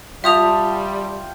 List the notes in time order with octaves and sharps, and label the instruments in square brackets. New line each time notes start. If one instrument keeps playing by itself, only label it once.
[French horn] G3 [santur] F4 G5 A5 [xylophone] E5 D#6 F7